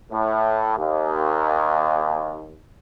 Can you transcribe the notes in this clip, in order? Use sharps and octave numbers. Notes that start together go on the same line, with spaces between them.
A2
D#2